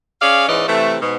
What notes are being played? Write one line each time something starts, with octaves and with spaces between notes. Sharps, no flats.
C#4 G#4 D5 F5
G#2 E3 C#4 D5 D#5
C3 E3 A3
G#2 B2